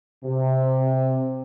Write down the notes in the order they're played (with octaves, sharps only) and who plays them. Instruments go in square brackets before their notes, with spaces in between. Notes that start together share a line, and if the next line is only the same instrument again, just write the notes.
[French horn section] C3